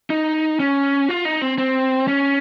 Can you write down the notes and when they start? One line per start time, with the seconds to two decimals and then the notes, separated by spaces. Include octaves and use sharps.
0.10 D#4
0.60 C#4
1.09 F4
1.25 D#4
1.41 C4
1.58 C4
2.08 C#4